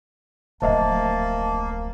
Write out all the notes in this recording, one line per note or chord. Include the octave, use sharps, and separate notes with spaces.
D1 A#1 A#3 C5 D#5 E5 A5